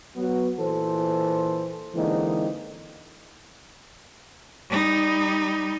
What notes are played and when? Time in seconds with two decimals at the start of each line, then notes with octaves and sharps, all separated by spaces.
0.16 F#3 B3 F#4
0.59 A#2 E3 A4 C5
1.95 D3 E3 G#3 A#3 C4 D#4
4.70 G3 D#4